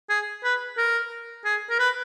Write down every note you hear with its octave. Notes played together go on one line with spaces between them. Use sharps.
G#4
B4
A#4
G#4
A#4
B4